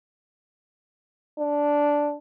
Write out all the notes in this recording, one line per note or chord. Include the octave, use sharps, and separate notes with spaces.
D4